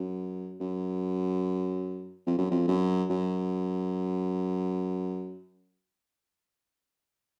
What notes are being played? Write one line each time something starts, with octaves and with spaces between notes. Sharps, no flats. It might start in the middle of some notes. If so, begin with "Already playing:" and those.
Already playing: F#2
F#2
F2
F#2
F2
F#2
F#2